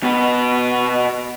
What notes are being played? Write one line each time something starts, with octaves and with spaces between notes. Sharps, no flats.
B2 B3